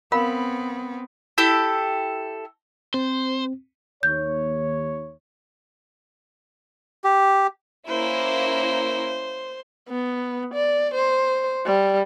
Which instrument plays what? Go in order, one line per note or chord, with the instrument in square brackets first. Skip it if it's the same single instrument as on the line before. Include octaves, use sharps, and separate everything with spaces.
[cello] B3 C4 [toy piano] A#4 F5 B5
[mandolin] E4 G4 A4 E6
[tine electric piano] C4 [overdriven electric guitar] C5
[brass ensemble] D#2 C#5 [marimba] G6
[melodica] G4
[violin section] A#3 C#4 E4 [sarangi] C5
[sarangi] B3
D5
C5
G3